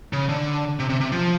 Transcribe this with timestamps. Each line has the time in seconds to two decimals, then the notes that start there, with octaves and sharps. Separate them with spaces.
0.13 C#3
0.29 D3
0.79 C3
0.89 C3
1.01 C3
1.12 F3